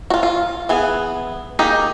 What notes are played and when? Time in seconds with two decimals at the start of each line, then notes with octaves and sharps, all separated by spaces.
0.10 F4 F#4
0.23 F4
0.69 E3 B3 G#4
1.59 D#3 A#3 D#4 G4 G#4